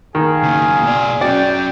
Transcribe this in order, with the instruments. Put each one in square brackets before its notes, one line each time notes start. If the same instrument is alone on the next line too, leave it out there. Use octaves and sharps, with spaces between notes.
[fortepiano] D#3 [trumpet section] G#4 F5
[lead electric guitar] C#3 A#3
B2 D5
[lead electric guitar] C#4 F#4 [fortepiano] D5 [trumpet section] G5